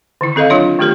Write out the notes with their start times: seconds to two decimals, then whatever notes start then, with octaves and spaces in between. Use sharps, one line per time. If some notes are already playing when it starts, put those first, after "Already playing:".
0.21 D3 D#3 E4
0.36 C4 A4 A#4 D#5 F5
0.50 F#3 D4 F4 C#5
0.79 D#3 A3 F4 G4 A#4